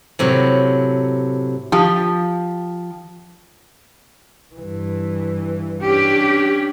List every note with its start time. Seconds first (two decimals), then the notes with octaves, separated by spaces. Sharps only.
0.19 A2 C3 F#3
1.72 F3 G4
4.55 G2 E3
5.84 C#4 D4 G4